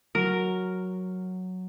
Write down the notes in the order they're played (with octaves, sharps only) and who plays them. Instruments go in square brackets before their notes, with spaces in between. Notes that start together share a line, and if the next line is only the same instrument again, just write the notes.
[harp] F#3 [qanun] A#4